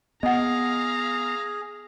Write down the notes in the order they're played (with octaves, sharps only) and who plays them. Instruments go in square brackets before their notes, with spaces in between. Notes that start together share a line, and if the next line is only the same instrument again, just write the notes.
[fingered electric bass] B3 [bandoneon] G#4 [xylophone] D#5 F#5 [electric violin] F5 A#5